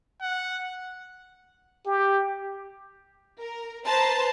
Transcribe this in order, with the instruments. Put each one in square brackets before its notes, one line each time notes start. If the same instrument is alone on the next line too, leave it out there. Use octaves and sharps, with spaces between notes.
[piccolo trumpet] F#5
[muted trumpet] G4
[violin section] A#4
B4 C5 A5 A#5 C6